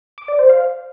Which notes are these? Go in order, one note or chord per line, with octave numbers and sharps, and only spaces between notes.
D6
D5
C5
F5